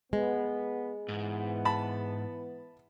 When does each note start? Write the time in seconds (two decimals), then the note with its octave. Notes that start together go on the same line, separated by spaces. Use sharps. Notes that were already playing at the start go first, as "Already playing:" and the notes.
0.13 G#3 B3
1.08 G#2 E3 B3
1.65 A5 B5